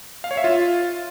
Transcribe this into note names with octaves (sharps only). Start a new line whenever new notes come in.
F5
C#5
E5
F4